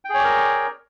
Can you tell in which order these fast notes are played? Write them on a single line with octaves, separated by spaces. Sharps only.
G5 G#4 C#5 D5 A#4